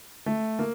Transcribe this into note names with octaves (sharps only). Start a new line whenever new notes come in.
A3
A#3